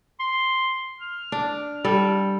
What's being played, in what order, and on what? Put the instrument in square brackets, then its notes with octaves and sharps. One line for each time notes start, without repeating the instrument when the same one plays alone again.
[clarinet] C6
F6
[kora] D4
G3 A4